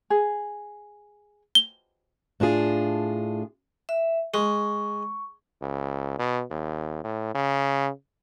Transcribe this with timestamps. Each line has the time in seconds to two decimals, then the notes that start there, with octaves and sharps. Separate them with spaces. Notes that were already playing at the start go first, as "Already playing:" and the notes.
0.10 G#4
1.55 G7
2.40 A2 D4 F4 G#4
3.89 E5
4.34 G#3 C#6
5.62 C#2
6.18 B2
6.50 D#2
7.04 A2
7.35 C#3